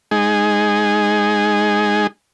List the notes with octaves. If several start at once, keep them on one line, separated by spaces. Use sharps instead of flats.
G#3 D#4 G#4